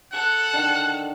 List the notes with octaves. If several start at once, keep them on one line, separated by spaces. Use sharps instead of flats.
A4 F#5 F#6
D3 D#3